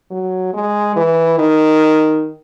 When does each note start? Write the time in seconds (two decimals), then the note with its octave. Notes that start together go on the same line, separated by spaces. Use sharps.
0.11 F#3
0.54 G#3
0.96 E3
1.38 D#3